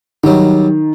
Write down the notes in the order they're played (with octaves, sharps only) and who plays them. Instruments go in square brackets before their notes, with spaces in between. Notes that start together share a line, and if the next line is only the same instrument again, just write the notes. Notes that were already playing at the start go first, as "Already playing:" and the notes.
[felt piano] D#3 [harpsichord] F#3 G3